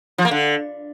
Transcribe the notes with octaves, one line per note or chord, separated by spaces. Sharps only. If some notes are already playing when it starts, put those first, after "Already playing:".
F3
A#3
D3